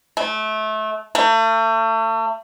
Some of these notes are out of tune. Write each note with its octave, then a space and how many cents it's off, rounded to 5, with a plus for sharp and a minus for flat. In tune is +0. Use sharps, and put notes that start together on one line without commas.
A3 -25
A3 +35